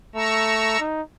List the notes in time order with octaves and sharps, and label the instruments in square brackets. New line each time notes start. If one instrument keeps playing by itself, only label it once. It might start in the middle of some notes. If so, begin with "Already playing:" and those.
[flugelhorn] A3 [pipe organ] A#5 C#6 E6
[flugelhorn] D#4